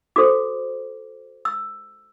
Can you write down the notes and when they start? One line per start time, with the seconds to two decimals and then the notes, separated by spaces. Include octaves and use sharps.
0.16 F#4 A4 C5 D6
1.45 E6